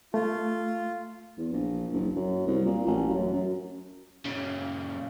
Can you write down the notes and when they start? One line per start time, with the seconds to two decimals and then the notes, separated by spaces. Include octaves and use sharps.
0.14 A3 F4
1.38 E2
1.52 A#1
1.93 F#1
2.16 F#2
2.47 C2
2.66 A#2
2.86 A1
3.08 F#2
3.33 F#2
4.25 A#2 C#3